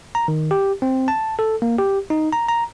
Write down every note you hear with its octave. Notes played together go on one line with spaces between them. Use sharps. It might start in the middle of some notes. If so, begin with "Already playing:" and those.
A#5
D#3
G4
C4
A5
A4
A#3
G4
D#4
A#5
A#5